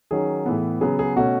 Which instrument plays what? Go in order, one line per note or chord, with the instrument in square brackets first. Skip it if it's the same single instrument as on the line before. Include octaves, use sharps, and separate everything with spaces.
[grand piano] D#3 F#3 C#4 G#4
A2 E3 B3
C#3 F#3 B3 G#4
G#4
B2 A3 C#4 F#4